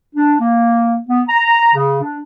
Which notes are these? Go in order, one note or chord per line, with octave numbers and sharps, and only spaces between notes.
D4
A#3
B3
A#5
C#3
D4